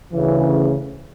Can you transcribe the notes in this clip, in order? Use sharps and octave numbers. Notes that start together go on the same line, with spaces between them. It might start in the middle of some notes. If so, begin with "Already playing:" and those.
D2 C#3 E3